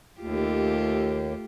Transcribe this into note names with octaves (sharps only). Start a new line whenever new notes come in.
D#2 A3 F4 G4